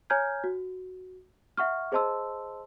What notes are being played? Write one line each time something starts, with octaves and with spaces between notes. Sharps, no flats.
C#5 G#5 A#5 F6 G6 G#6
F#4
E5 F#5 C#6 F6
G#4 C5 D#5 A5 C6 E6